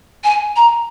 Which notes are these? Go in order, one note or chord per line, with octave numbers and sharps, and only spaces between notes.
G#5
A#5